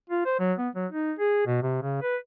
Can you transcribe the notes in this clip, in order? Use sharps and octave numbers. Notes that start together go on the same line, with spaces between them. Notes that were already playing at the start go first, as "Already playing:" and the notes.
F4
C5
F#3
B3
F#3
D#4
G#4
B2
C3
C#3
B4